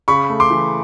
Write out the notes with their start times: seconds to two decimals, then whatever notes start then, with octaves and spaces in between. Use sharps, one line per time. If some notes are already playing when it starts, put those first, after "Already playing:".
0.08 C#3 B5 C#6
0.29 A3
0.40 C6 D6
0.50 E3